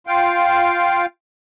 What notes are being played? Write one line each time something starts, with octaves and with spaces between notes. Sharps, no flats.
F4 F5 G5